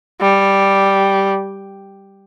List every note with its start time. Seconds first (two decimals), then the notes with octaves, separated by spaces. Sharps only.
0.21 G3